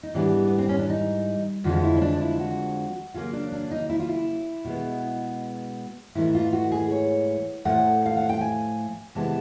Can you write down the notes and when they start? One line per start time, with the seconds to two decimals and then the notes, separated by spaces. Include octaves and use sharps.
0.03 D#4
0.14 G#2 E3 G3 B3 D4
0.48 B3
0.58 C4
0.69 C#4
0.79 D4
0.90 D#4
1.64 F2 D3 F3 G#3 F#4
1.83 E4
1.97 C#4
2.02 D4
2.21 E4
2.39 F#4
3.14 C#3 F#3 A#3 F4
3.33 D4
3.52 D4
3.71 D#4
3.89 E4
3.99 F4
4.09 E4
4.65 B2 G#3 B3
6.15 G#2 E3 A3 E4
6.35 F4
6.53 F#4
6.72 G#4
6.91 C#5
7.65 A2 F3 A3 F#5
8.06 F5
8.17 F#5
8.29 G5
8.41 G#5
9.15 C3 E3 G#3 B3 A5